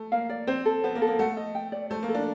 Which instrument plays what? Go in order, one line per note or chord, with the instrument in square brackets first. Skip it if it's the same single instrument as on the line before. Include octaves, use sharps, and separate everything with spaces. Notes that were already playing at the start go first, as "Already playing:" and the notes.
Already playing: [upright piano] A3
[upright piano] A#3 [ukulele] F5
[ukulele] D5
[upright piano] C4 [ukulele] C5
[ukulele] A4
[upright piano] B3 [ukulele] C5
[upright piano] A#3
[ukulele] A4
[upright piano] A#3
[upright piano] A3 [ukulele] F#5
[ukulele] D#5
G5
D5
[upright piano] A3 [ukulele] C5
[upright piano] A#3
[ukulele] A4
[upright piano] D4